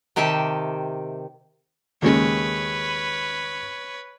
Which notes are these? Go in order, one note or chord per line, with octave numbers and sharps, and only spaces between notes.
C3 D#3 G4 E5 A5
D#2 C#3 G#3 B4 C#5